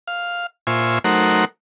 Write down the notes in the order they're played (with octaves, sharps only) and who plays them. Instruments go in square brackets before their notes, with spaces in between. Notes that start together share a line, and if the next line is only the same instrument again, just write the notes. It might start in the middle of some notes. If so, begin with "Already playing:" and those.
[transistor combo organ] F5
A#2 F4 C5 E5 G#5 C#6
F#3 A3 D#4 A#4 C5 F#5